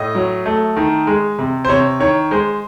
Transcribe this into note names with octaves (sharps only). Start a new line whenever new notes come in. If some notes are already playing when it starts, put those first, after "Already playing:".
Already playing: A2 D#5
F#3
A3
D#3
G#3
C3
C5
C3 C#5
D#3 C#5
G#3 C5